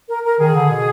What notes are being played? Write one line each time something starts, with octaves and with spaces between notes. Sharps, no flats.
A#4
A#4
D#3 G#4
D3
B2